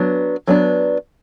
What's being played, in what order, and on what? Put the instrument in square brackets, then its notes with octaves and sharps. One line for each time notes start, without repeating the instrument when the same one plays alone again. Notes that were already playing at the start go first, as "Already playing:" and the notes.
Already playing: [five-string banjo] F#3 B3 D4
F#3 B3 D4